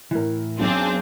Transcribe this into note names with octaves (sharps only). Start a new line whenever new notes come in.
A2 E3 E4 A#4
B1 F#2 C4 D4 G#4